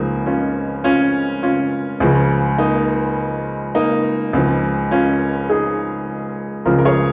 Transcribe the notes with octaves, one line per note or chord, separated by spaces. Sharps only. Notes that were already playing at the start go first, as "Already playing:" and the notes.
Already playing: C#2 C#3 F3 A#3 D#4
C#4 F4
C#4 F4
C#4 F4
C#2 C#3 F3
A#3 D#4
A#3 D#4
C#2 C#3 F3
C#4 F4
D#4 G#4
C#2 C#3 F3 F4 A#4
A#4
G#4 C#5